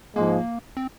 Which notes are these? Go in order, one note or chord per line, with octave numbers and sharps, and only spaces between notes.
G#2 F3 G#3 A#3
C4